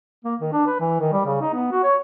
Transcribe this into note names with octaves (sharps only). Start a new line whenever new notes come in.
A#3
D#3
D4
B4
E3
D#3
G3
C#3
D#4
B3
F#4
C#5